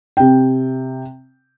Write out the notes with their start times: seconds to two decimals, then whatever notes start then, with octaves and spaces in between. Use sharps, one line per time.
0.17 C3 G5